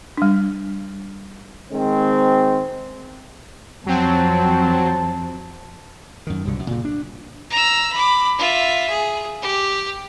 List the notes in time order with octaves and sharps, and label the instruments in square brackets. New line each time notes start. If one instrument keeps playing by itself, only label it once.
[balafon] G3 D4
[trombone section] D#3 G#3 C4
[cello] F2 [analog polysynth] F#3 C4 [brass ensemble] A5
[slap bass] F#2 D#3
C2 G2 B2 D3
F#2
A#2 C#3
D4
[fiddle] A#5 E6
B5 D6
F4 E5
G#4
G4